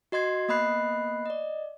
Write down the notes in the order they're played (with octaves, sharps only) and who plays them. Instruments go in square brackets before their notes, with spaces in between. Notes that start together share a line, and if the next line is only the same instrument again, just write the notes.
[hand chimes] F#4 D#5 C6 G#6 C7
A#3 B3 D#5 B5 F#6 C7
D5 D#5